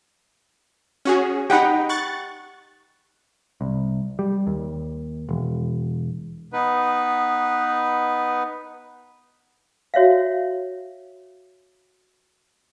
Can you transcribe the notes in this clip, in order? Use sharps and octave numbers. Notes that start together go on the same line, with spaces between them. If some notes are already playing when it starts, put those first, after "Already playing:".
C#4 F#4 G#4
D#4 G4 F#5 G5 B5
C#6 F#6 A6
C2
G3
D#2
E1
B3 D#4 B4
F#4 C#5 E5 F5